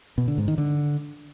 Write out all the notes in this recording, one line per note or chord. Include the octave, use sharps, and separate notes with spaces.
B2
D3
G#2
D#3
D3